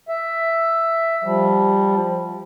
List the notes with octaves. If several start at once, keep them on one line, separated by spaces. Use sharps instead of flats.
E5
F3 G3